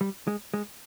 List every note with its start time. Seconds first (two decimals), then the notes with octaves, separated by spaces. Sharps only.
0.01 G3
0.28 G#3
0.54 G#3